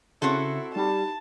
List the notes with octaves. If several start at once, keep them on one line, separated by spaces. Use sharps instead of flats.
C#3 C4 E4 F#4 A4
G3 D#4 G4 A5 B5